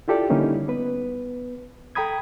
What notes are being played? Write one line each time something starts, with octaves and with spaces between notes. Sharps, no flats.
E4 F4 G4 A4 D5
D3 G3 A#3 C#4 D#4 E4
B3 B4
A4 G5 A#5 B5 D#6 G#6